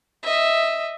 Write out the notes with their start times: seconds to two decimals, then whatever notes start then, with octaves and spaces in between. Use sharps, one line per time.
0.23 D#5 E5